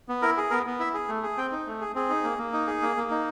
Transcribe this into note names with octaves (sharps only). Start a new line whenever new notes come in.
B3
E4 A#4
G#4
B3 A#4
B3
E4 E5
G#4
A3
G#4
C4 G5
D#4
A3
G#4
C4 G#4
D#4
A#3
A#3
D#4
G#4
A#3
A#3
D#4